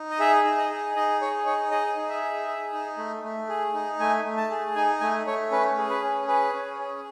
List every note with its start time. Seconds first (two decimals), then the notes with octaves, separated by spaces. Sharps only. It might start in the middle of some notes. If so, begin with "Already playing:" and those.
Already playing: D#4
0.10 D#5
0.19 G#4 E5
0.44 D#4
0.58 D#5
0.70 G#4
0.96 D#4 D#5
1.21 G#4 C#5
1.46 D#4 C#5
1.71 G#4 D#5
1.97 D#4
2.09 E5
2.22 G#4
2.48 G#4
2.72 D#4
2.98 A3
3.24 A3
3.49 G#4
3.74 D#4
3.99 A3 G#5
4.25 A3
4.37 A5
4.50 G#4
4.75 D#4 G#5
5.00 A3 G#5
5.27 A3 C#5
5.51 C#4 B4
5.77 G#4
5.90 B4
6.02 C#4
6.27 G#4 B4
6.53 C#4
6.79 G#4